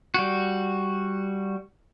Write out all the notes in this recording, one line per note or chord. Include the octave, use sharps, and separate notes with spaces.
G3 F#4